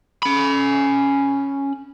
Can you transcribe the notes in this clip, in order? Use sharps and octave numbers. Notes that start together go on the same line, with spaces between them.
C#4 B5